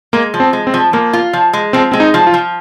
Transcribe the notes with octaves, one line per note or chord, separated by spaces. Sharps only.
G#3 A#3
F3
C4
G#3
C4
F3
F3 A#3
F4
F3
G#3
F3 C4
G#3 C4
D#4
F3
F4
F3